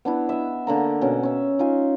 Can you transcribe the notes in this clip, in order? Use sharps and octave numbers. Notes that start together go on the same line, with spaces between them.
B3 D4 E4
D#5 E5
D3 A#3 A#5
B2 C#4
C#4 E5
D#4 F4 G#5